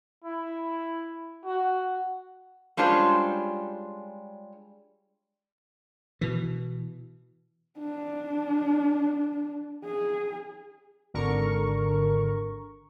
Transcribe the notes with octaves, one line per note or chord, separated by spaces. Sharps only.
E4
F#4
G3 G#3 C#4 D4 F4 C5
B2 E3
D4
G#4
G#1 D3 A#4 C#6